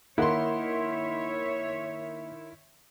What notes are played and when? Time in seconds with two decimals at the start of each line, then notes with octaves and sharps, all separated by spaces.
0.18 D#3 A#3 E4 C#5 E5 F#5 C6